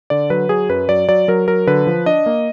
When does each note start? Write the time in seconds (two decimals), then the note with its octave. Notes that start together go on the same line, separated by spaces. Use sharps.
0.10 D3 D5
0.30 F#3 B4
0.49 F#3 G#4
0.69 F#2 B4
0.89 F#3 D5
1.08 F#3 D5
1.28 F#3 A#4
1.48 F#3 A#4
1.67 D3 B4
1.87 F3
2.06 D4 D#5
2.26 A#3